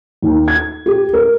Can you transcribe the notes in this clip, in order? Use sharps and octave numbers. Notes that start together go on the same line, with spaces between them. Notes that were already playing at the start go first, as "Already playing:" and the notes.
D#2
G#6
G4
A#4